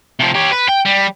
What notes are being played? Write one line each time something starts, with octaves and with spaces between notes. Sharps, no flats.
C3 F3
G4 C#5
B4
G5
G3